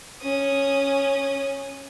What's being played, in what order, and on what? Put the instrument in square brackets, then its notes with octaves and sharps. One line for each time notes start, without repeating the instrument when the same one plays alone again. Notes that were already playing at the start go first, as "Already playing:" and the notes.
[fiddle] C#4 D#6